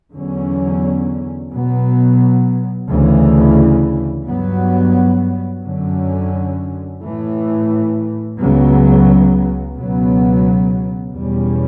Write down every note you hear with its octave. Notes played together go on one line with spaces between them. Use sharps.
E2 D3 F#3 C#4
B2 F#3 B3
D2 C#3 E3
G2 F#3 B3
F#2 D3 F#3 C#4
A2 E3 A3
C#2 C#3 F#3 B3
C#2 B2 F#3 B3
E2 B2 G3 C#4